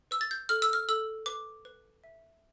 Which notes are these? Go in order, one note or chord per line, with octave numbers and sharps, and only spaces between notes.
B4 E6
A6
G6
A4 F6
E6
F6
A4 E6
B4 D6
B4
E5